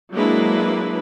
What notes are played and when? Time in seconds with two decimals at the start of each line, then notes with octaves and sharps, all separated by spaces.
0.13 F#3 G#3 A#3 D4 E4 B4